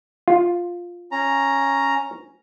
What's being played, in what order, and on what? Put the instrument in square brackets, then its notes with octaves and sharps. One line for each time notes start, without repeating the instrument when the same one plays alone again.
[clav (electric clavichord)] F4
[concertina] C#4 A#5